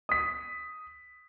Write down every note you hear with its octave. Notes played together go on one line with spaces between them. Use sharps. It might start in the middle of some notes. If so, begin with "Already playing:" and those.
D#6 B6